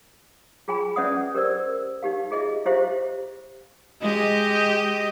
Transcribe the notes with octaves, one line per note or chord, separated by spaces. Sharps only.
F4 G#4 G5 G#5 B5
C#4 B4 D5 E5 F#5 D#6
G4 A#4 C5 D5 E6
D#4 G4 F5
F4 G#4 D#5 E5
E4 F4 G4 C5 E5 F5
G#3 G4 D#5